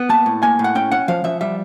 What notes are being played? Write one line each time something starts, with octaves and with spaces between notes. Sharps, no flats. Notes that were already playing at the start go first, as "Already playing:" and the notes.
Already playing: B3
A#3 A5
A2
A#3 G#5
A2
F#5
C#4 G5
C#4 F#5
F3 F5
F3 E5
G3 E5